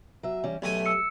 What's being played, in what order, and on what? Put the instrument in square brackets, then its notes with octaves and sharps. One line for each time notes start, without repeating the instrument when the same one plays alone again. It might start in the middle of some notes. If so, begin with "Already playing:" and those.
[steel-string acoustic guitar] F#3 E5
E3 G3 C#4
[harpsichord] B1 A3 G#5 [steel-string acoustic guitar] G4
[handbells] E6 C#7